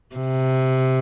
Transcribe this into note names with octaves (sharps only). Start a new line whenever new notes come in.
C3